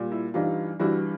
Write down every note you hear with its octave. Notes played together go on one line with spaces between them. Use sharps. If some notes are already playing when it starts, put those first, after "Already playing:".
Already playing: A#2 G3
E4
G2 E3 G3 D#4 F4
G2 E3 G3 E4 F#4